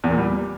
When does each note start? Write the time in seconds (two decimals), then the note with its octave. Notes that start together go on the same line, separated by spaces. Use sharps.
0.04 E2
0.11 A#2
0.18 G3